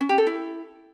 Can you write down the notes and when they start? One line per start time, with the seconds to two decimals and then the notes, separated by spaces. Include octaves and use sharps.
0.01 C#4
0.09 G4
0.18 A4
0.27 E4